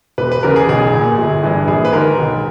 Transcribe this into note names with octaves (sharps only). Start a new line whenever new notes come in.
E1 B4
B4
E2 C#3 A#4
G#4
B1 G#4
A#2
G1
G2 E3
A#1 G#4
B4
G#2 D#3 A#4
B1